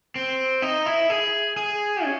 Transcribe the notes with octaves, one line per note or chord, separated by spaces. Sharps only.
C4
D#4
E4
G#4
G#4
C#4